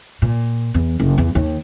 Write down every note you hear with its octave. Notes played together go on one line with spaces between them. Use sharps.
A#2
E2
F#1
E2
D#2